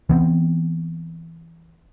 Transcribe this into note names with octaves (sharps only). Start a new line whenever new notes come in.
E3 B3 C4